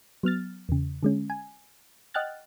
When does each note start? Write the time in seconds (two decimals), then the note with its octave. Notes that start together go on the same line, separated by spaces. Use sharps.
0.23 F#3 B3 F6 A6
0.69 E2 C#3
1.03 D3 G#3 C#4
1.30 G#5
2.14 D#5 F#5 G5 F6 F#6 A6